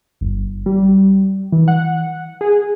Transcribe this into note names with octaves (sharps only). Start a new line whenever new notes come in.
G1
G3
E3
F#5
G#4